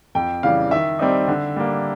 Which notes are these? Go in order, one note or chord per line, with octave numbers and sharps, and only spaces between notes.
F2 G5
C#3 E3 G3 F5
D#3 E5
G3 C4 D#4
D3
G3 A#3